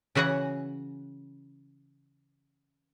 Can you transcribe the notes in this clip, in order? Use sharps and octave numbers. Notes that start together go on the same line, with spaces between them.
C#3 E3 F#4 G#4 F#5